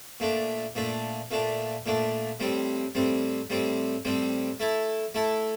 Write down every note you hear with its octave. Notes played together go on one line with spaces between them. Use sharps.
A#2 A3 D4
A#2 A3 D4
A#2 A3 D4
A#2 A3 D4
A2 G3 C4
A2 G3 C4
A2 G3 C4
A2 G3 C4
A3 E4 A4
A3 E4 A4